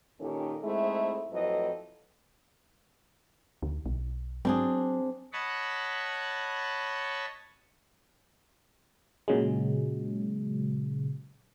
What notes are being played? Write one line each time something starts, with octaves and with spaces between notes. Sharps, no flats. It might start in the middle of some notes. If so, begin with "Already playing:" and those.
A#2 D#3 C#4 G4 A4
G#2 G#3 A3 C4 E4
F2 A2 F#3 B4 D#5
D2
B1
F#3 C4 D4 G#4
C#5 D#5 F#5 A5 B5 C#6
A#2 C#3 F#3 G#3